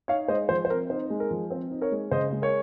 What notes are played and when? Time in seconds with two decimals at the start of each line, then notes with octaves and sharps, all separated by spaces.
0.08 D#4 C#5 F5
0.28 G#3 C5 D#5
0.49 F3 C5
0.65 C5
0.70 C4 A#4
0.90 D#4 C5
1.10 G#3
1.20 A#4
1.31 F3
1.50 C4 C5
1.71 D#4
1.81 A#4 C#5
1.92 G#3
2.11 C#3 C5 D#5
2.33 G#3
2.42 A#4 C#5